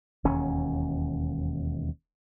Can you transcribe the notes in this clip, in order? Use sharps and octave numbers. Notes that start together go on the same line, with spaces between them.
E1 D#2 C#4